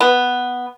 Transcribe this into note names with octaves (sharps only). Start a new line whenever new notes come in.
B3